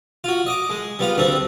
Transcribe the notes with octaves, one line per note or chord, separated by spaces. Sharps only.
F4 F#4
D#5 D6
G#3
G3 B3 F4
D2 G3 C4